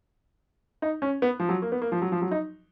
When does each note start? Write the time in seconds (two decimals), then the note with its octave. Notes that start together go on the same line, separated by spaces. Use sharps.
0.82 D#4
1.02 C#4
1.22 B3
1.40 F3
1.49 F#3
1.62 A#3
1.72 B3
1.82 A#3
1.92 F3
2.02 F#3
2.12 F3
2.22 F#3
2.31 D#4